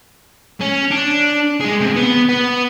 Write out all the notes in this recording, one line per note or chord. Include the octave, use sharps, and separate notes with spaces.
C#4
D4
G#3 G#4
D2 C3
B3
B3